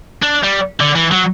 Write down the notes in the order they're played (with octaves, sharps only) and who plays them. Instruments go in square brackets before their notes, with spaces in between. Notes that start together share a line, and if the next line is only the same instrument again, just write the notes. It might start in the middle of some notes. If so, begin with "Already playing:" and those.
[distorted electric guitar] D4
G3
D3
E3
F#3